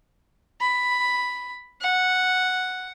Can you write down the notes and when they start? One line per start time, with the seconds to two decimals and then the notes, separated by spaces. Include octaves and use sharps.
0.61 B5
1.82 F#5